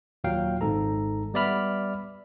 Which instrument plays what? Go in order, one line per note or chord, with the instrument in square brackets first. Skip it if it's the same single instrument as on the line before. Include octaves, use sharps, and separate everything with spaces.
[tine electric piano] D#2 A#2 F#3 F5 G5
G#1 G#2 A4 A#5
G3 B3 D5 E5 B5 F6